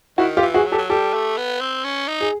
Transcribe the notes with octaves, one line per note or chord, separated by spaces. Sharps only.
D#3 E4 F#4
F4 G4
E3
F#4 G#4
F#3
G4 A4
F#3
G3 G4 A4
A3
B3
C4
C#4
D#4
G#4